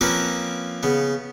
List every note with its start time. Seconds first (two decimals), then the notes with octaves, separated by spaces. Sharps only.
0.01 F3 A#3 C4 C#4 A#4 B4
0.83 C#3 B3